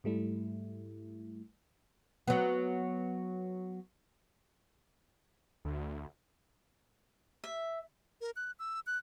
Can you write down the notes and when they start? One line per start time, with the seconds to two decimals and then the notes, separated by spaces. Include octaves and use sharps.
0.04 G#2 G3 A3 E4
2.28 F#3 B3
5.65 D2
7.44 E5
8.21 A#4
8.36 F#6
8.59 E6
8.87 F#6